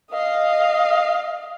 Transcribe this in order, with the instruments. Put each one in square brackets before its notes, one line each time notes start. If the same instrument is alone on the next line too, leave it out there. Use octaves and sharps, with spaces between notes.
[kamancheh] D#5 F5